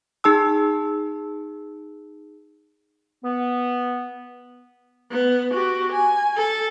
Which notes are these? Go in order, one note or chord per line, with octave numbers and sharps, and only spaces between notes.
D#4 G#4 A5 E6
B3
B3
F#4 G4
G#5
A4